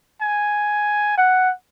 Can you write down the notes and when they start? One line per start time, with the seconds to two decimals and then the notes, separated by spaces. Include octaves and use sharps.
0.22 G#5
1.18 F#5